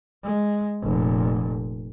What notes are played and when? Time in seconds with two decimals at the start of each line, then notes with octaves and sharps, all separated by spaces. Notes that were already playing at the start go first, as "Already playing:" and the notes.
0.23 G#3
0.83 F1 A#2